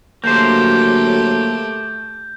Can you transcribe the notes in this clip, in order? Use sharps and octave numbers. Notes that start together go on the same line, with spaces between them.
D3 F#3 A3 A#3 G4 C5 G6